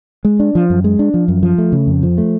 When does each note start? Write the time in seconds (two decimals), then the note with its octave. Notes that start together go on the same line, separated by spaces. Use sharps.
0.25 G#3
0.40 D4
0.55 F3
0.70 F#2
0.84 G#3
0.99 D4
1.14 F3
1.28 F#2
1.43 F3
1.58 A3
1.72 C#3
1.87 F2
2.03 F3
2.18 A3